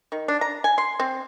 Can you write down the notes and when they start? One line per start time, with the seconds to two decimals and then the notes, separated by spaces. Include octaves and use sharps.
0.12 D#3
0.28 D4
0.41 A#5
0.64 G#5
0.78 C6
1.00 C4